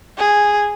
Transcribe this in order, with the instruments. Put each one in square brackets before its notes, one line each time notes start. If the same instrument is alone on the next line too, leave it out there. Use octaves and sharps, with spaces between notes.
[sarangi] G#4